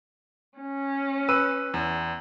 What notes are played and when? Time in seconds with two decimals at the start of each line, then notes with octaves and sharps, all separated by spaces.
0.59 C#4
1.29 B4 E6 D#7
1.74 E2